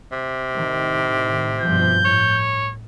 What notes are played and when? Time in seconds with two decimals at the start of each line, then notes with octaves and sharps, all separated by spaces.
0.12 C3
0.54 A2 D#3
1.62 G2 B2 F3 G6
2.05 A2 C#5